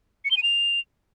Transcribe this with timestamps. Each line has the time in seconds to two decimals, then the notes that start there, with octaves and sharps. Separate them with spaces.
0.25 C#7
0.31 G7
0.37 D#7
0.43 F7